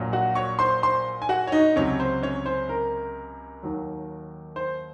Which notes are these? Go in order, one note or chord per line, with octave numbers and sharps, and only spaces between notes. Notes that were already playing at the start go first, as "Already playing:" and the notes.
Already playing: A#1 A#2 F#3
F#4 F#5
C#5 C#6
C5 C6
C5 C6
G#5
F#4 F#5
C#5
D#4 D#5
C#2 C3 F#3 C#4 C#5
C5
C#4 C#5
C5
A#4
D#2 D#3 F#3
C5